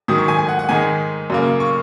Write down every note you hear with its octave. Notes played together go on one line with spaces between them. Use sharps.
G#2 D#3 F#3 D#6
C#6
G#5
G#5
F#5
F#5
G#2 D#3 G#3 G#5
F#2 C#3 A#3
C#6